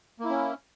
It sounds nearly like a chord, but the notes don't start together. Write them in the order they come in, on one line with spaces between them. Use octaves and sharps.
A#3 E4 C#4